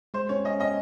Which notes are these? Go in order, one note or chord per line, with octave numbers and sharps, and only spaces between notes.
G#3 C5
C#4 C#5
C#4 D#5
C#4 D#5